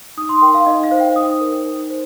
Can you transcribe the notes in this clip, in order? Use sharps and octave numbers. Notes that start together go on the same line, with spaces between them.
D#4 D#6
C6
A#4 G5
F5
D#4 D#5
F5
C5
G5
D#4 D#6
A#4
D#4
C5